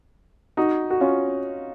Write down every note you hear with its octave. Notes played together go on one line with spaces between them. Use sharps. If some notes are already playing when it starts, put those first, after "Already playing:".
D#4 F#4
F#4
C#4 F4